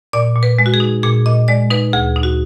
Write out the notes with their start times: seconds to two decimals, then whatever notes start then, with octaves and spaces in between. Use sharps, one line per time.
0.13 A#2 D5
0.36 A#2
0.43 B4
0.59 G#3
0.66 F#4
0.74 G#4
0.80 D#4
1.03 A#2 G#4
1.26 A#2 D#5
1.48 G#3 D5
1.71 D#4 B4
1.93 D2 G#4
2.16 D#4
2.23 F#4